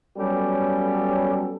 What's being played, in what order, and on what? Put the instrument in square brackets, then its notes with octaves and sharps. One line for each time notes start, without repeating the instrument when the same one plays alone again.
[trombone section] F#3 G3 B3 C#4 G4 A4